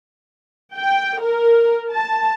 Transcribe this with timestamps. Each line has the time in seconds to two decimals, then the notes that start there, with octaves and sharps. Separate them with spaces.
0.77 G5
1.22 A#4
1.92 A5